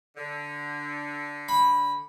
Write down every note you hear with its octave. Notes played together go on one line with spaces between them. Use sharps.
D3
B5